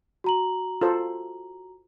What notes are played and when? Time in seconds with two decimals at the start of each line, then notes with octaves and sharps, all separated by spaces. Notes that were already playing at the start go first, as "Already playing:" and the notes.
0.24 F#4 A#5 F#7
0.81 F4 A4 C5